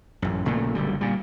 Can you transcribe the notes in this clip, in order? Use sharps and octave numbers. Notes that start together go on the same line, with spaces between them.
A1 F#2
A#1 A#2 C#3 A3
F#1 D3 G3
A#2 G3